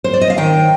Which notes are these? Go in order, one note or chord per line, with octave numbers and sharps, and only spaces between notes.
C5
D5
D#5
F5
D#3 G5